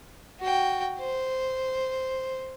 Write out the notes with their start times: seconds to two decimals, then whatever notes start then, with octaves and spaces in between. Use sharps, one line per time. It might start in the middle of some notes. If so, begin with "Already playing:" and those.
0.40 F#4 G5
1.00 C5